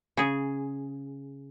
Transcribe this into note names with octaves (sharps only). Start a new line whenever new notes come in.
C#3 G#4